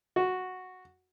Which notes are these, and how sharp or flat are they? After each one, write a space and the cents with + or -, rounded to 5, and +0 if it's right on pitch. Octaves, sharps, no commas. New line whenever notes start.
F#4 -5